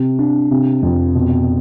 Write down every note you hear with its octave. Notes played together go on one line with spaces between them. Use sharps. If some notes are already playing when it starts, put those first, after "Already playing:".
Already playing: C3
D4
C3
F2
B2